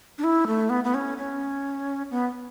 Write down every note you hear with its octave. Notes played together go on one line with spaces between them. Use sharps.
D4
E4
A3
B3
B3
C#4
C#4
B3